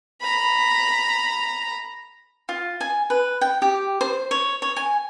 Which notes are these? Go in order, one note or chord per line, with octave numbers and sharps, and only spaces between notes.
A#5 B5
F4
G#5
B4
G5
G4
C5
C#5
C#5
G#5